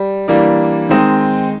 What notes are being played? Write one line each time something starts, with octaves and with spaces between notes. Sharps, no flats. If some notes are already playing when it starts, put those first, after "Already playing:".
Already playing: G3
E3 G3 A#3 D4
D#3 G#3 C4 D#4